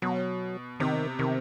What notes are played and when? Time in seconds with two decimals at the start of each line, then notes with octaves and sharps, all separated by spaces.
0.02 B2 F#3
0.80 C3 D#3
1.19 C3 D#3